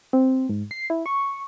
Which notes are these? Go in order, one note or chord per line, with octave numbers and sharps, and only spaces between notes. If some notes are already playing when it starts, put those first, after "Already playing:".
C4
G#2
C7
E4
C#6